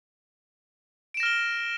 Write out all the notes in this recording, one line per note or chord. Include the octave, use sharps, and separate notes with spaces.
F6 A#6 D7 E7 G7